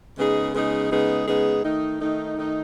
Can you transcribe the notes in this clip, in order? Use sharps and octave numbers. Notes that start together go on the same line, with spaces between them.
C#3 G#3 B3 D#4 G#4
C#3 G#3 B3 D#4 G#4
C#3 G#3 B3 D#4 G#4
C#3 G#3 B3 D#4 G#4
D#3 A3 D#4
D#3 A3 D#4
D#3 A3 D#4